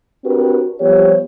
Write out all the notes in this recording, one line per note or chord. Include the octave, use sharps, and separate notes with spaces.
C4 D4 F#4 G4 A#4 B4
F3 G3 B3 G4 C5 C#5